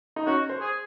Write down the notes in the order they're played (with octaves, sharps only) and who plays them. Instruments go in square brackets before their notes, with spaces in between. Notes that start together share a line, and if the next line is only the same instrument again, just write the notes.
[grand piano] D#4
[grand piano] C#4 [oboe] F#4
[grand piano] C5
[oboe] G#4